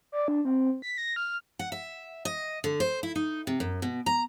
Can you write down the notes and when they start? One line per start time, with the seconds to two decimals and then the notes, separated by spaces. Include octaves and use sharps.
0.12 D5
0.28 D4
0.45 C4
0.82 B6
0.98 A#6
1.16 F6
1.59 F#5
1.72 E5
2.25 D#5
2.64 D3
2.80 C5
3.03 E4
3.15 D#4
3.47 C3
3.60 F#2
3.82 B2
4.06 A#5